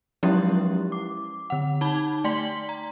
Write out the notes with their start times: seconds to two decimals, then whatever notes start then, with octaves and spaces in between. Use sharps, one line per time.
0.23 F3 F#3 G#3 C#4 E4 G4
0.92 D6
1.50 D3 F#5
1.81 D#4 A5 B5 G#6 G7
2.24 A3 D5 G5 C6 B6 F#7
2.69 A#5